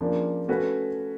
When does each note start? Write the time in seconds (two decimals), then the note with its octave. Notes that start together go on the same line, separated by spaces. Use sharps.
0.01 C#3 F3 A#3 D4
0.48 A3 C#4 F#4 B4